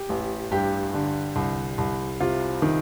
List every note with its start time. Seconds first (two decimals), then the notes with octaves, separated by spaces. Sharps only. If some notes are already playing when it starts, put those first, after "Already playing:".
Already playing: G4
0.09 A1
0.51 G2 G4
0.94 D3
1.36 C2
1.78 C2
2.20 C3 F4
2.62 D#3